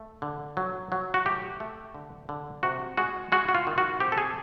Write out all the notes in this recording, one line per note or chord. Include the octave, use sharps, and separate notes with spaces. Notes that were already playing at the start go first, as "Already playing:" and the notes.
Already playing: A3
D3
F#3
F#3
F#4
A3 G4
A3
D3
D3
C3 F#4
G#3 F#4
G#3 F#4
F#4
F4
D#3
F#4
C4 G4
A4
G#4